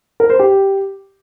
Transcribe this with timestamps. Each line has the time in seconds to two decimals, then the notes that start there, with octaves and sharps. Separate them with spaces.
0.20 A#4
0.30 C5
0.39 G4